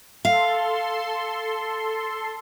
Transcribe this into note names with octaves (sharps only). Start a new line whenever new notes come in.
A4 F5 C6